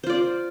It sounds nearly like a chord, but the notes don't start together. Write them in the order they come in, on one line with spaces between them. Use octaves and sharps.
C5 F4 D5